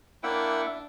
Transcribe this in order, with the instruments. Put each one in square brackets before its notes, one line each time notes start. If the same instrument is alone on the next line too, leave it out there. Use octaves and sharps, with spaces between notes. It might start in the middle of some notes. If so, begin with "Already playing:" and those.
[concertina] A#3 F#5 G5 [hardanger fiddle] D4 [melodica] E4 E5